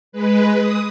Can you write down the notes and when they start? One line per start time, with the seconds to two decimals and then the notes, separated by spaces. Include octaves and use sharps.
0.12 G#3 B4
0.56 D#6